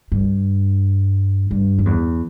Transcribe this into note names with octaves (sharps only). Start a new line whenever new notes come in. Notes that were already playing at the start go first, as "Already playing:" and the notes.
G2
G2
F#2
E2